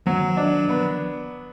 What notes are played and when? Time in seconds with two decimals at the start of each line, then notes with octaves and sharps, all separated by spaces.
0.06 D#3 F3 F#3
0.37 D4
0.69 D#3 F3 B3